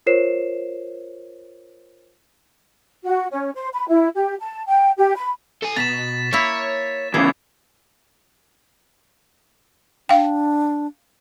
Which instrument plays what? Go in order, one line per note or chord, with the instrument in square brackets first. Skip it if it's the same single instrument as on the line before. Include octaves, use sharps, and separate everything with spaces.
[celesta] F4 A#4 C5 C#5 C7 E7
[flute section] F#4
C#4
C5
B5
E4
G4
A5
G5
G4
B5
[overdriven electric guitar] A4 G#5
[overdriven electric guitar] B2 [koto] A#5 [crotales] A6 B6 E7
[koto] A#3 E4 [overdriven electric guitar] C#5
[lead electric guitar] E2 C#3 [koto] E3 [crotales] D6 G#6 C7
[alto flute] D4 [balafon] F5 G5